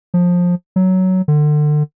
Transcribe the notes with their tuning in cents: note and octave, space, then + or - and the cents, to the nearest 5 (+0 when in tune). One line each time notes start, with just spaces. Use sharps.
F3 +20
F#3 +10
D3 +30